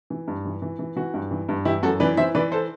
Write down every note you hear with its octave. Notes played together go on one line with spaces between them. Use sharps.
E3
G2
E3
E3
E3
E3 F#4
G2
E3
G2
E3 E4 G4
F#2 F#4 A4
E3 B4 D5
E3 C5 E5
E3 B4 D5
A4 C5